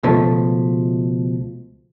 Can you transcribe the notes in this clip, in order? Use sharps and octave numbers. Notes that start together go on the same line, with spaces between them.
C#2 B2 F3 A3